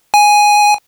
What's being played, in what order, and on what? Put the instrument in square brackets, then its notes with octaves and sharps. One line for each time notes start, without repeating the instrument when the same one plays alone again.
[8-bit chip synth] G#5